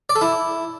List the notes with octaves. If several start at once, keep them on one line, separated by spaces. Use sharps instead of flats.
D5
A4
E4